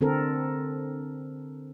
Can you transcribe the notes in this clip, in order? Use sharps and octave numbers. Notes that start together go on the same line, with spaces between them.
D3 C4 A4 A#4